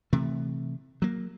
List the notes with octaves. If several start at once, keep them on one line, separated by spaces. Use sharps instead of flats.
C3 E3 A3
F#3 A#3